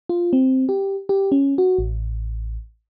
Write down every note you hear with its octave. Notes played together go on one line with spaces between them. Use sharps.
F4
C4
G4
G4
C#4
F#4
A1